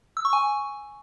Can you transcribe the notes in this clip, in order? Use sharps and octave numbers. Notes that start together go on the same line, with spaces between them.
E6
C#6
G#5